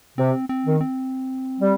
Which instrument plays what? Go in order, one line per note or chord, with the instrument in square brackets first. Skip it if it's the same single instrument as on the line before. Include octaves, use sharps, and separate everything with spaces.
[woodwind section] C3 [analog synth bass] C4
[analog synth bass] C4
[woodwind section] D#3
[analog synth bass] C4
[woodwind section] G3